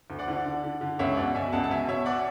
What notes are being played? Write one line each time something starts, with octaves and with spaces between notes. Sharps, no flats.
D2
D5 F#5
D3
D3
D3
D3
C#2 C#5 E5
B2 D5 F#5
B2 E5 G#5
C#2 F#5 A5
A5
B2 E5 G#5
B2 C#5 E5
D5 F#5